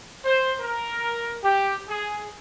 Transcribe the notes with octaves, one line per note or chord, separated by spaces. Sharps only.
C5
A#4
G4
G#4